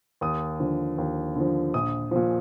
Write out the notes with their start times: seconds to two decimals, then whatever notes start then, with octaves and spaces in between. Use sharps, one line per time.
0.21 D#2 D#6
0.60 D3 F3
0.98 D#2
1.36 D3 F3
1.74 A#1 D#6
2.11 A#2 F3